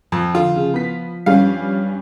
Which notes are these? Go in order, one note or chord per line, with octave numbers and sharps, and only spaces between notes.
F2 F3
D3 F4
C#3
B3 B6
G2 G3 C#4 F5